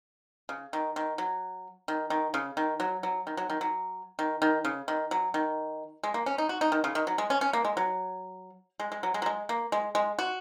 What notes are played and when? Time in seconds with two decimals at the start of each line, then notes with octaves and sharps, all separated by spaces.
0.49 C#3
0.73 D#3
0.96 D#3
1.18 F#3
1.88 D#3
2.10 D#3
2.34 C#3
2.57 D#3
2.80 F#3
3.03 F#3
3.27 D#3
3.37 F#3
3.50 D#3
3.61 F#3
4.19 D#3
4.42 D#3
4.65 C#3
4.88 D#3
5.11 F#3
5.34 D#3
6.04 G#3
6.14 A#3
6.26 C#4
6.38 D#4
6.49 F#4
6.61 D#4
6.72 D#3
6.84 C#3
6.95 D#3
7.07 F#3
7.18 G#3
7.30 C#4
7.41 C#4
7.53 A#3
7.65 G#3
7.77 F#3
8.80 G#3
8.92 G#3
9.03 F#3
9.14 G#3
9.22 F#3
9.26 G#3
9.49 A#3
9.72 G#3
9.95 G#3
10.19 F#4